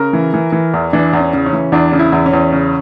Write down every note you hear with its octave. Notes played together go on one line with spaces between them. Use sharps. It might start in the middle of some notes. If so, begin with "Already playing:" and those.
Already playing: C#3 A#4
E3
E3
E3
E2
E3 D4
E2
C#4
C#3
C#4
E3
E2 D4
C#3
E4
E2
C#4
E2
C#3